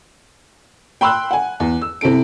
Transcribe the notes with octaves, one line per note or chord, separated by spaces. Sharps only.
G5 B5 C6 E6 F#6
F#5 G#5
E2
E6
C3 E4 A4 D7